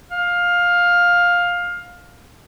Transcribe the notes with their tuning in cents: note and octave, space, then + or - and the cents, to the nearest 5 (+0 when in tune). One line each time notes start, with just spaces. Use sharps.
F5 +15